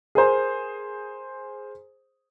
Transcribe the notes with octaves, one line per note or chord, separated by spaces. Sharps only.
G#4 A#4 C5